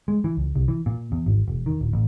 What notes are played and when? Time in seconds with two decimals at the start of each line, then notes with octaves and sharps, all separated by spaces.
0.08 G#3
0.24 E3
0.37 C#2
0.56 C2
0.68 E3
0.86 A#2
1.12 E2
1.26 G#1
1.48 E1
1.66 D#3
1.81 D1
1.93 A1